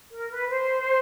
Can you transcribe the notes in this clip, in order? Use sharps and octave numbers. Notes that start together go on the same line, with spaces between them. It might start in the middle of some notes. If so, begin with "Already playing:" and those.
A#4
B4
C5